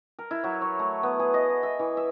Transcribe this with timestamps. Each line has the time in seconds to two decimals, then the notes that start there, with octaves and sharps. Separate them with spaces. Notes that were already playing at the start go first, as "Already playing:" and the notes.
0.19 A#4
0.31 E4
0.44 F#3
0.62 C#5
0.79 A3
1.03 B3
1.19 G#4
1.34 D#5
1.50 A#5
1.63 E5
1.79 E3
1.97 E5